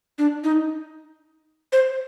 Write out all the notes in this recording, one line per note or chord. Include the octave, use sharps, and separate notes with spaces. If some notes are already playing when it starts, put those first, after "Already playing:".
D4
D#4
C5